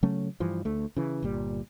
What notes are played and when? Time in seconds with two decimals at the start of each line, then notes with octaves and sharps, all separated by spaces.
0.03 C#3 F#3 A3 C#4
0.40 G2 E3 F3
0.65 D2 A3
0.97 C#3 E3
1.23 G1 A#2 G3